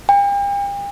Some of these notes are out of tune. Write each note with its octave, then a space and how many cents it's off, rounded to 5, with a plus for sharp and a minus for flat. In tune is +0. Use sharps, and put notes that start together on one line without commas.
G5 +40